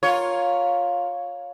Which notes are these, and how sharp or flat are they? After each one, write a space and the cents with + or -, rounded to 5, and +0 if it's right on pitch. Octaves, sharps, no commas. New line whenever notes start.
F4 +15 A#4 +0 C#5 +0